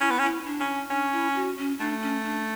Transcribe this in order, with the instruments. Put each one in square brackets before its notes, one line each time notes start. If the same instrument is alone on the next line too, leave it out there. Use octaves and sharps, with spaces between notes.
[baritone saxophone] C#4 [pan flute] E4
[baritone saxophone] B3
C#4
[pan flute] E4
D4
[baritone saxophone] C#4
[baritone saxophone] C#4 [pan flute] D4
[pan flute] E4
F#4
C#4
[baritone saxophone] A3 [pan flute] D4
[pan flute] C#4
D4